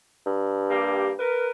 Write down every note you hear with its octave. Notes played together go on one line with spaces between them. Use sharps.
G2
G3 A#3 G4
A#4 B4